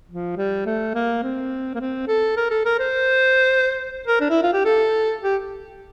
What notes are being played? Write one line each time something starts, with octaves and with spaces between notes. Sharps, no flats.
F3
G3
A3
A#3
C4
A#3
C4
A4
A#4
A4
A#4
C5
A#4
D4
E4
F4
G4
A4
G4